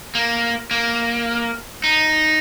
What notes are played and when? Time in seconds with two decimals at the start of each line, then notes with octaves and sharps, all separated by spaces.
0.15 A#3
0.71 A#3
1.84 D#4